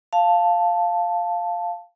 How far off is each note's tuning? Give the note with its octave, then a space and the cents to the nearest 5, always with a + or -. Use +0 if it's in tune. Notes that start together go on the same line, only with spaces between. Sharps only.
F5 +0 A5 +0